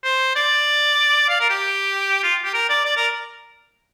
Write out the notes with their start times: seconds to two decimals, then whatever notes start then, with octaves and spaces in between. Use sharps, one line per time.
0.04 C5
0.36 D5
1.29 F5
1.40 A#4
1.50 G4
2.23 F4
2.44 G4
2.54 A#4
2.69 D5
2.85 D5
2.97 A#4